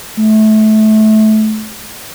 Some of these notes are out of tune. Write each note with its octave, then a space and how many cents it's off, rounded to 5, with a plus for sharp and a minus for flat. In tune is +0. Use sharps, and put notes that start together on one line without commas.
A3 -25